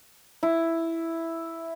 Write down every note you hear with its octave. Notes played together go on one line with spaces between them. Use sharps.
E4